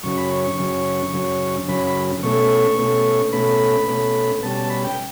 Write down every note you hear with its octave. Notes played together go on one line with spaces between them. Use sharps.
F#2 C#3 F#3 C#4 C#6
B5
C#6
C#6
F#2 C#3 F#3 C#4
F#2 C#3 F#3 C#4
F#2 C#3 F#3 C#4 B5
B5
B2 A3 C#4 C#6
B2 A3 C#4
B2 A3 C#4 B5
B2 A3 C#4
B2 G3 C#4 A5
A5
B5
G5